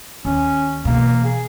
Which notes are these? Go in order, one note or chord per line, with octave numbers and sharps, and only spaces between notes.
D#2 C#4
B2 E3 A#3
G#4